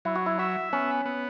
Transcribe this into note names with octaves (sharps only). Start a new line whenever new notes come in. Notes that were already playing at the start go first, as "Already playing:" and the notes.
F#3 E4
F#4
E4
F#4 E5
B3 C#4
B3